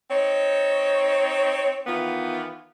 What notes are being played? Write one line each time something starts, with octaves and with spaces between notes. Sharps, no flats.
C4 D#4 C#5
D#3 E3 B3 F4